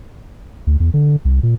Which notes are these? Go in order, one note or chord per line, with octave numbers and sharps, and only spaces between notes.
D2
E2
D3
C2
A#2